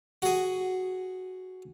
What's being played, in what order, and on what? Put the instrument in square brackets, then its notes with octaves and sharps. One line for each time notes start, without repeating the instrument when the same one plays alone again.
[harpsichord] F#4 G#4